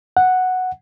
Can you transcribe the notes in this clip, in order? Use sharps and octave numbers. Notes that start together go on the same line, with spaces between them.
F#5